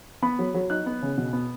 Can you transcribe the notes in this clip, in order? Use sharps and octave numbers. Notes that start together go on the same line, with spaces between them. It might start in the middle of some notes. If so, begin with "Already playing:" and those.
B3 B5
F#3
F#3
D#4 F#6
B3
C#3
B2
B3